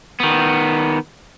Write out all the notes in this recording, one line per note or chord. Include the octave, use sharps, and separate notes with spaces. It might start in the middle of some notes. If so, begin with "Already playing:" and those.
D#3 B3